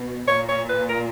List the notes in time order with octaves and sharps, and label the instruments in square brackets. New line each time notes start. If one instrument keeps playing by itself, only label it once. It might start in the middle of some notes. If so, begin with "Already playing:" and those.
Already playing: [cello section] B2
[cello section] A#2 [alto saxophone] C#5
[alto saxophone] C#5
B4
A#4